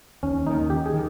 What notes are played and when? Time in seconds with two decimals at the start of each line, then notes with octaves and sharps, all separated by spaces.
0.23 D#2 C#4
0.46 D#3 A#3 D#4
0.70 D#2 G4
0.86 G#4
0.94 D#3